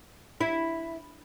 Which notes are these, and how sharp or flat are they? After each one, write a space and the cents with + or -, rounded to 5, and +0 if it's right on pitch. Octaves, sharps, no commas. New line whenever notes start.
E4 +0